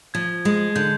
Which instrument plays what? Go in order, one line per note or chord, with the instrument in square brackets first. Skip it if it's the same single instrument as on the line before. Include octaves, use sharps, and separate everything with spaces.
[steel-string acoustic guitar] F3 [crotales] G#6
[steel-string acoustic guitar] G#3
[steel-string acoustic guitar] D3 [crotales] G6